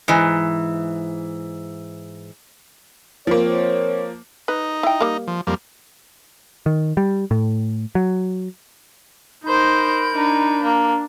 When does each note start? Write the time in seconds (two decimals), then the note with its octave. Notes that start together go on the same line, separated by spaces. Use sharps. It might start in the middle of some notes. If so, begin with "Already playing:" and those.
0.08 G#2 E3
3.27 F3 A#3 C4 C5 C#5
4.48 D#4 B4
4.83 E4 G5
5.01 G3 A#3
5.27 F3
5.47 F2 G3 A#3
6.66 D#3
6.97 G3
7.31 A2
7.95 F#3
9.45 D#4 A#4 C5 B5 G6
10.13 D4 D#4
10.63 A#3